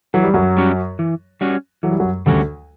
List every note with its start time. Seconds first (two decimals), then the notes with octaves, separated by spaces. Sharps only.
0.14 E3 F#3
0.23 G3
0.34 F#2 F#3
0.57 G3 C#4 F#4
0.99 E3
1.41 G3 C#4 F#4
1.83 E3 F#3
1.92 G3
2.00 F#2 F#3
2.26 D2 D3 G3 C#4 F#4